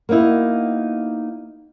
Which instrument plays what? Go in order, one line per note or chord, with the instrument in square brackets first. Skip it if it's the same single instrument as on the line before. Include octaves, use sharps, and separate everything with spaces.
[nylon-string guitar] A#3 B3 D#4 E4 F#4